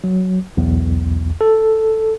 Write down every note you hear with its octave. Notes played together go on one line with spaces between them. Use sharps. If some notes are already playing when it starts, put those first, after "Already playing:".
F#3
B1 E2
A4